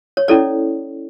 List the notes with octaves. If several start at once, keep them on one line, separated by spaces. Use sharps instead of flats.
C#5
C#4 E4 A4 C#5 D5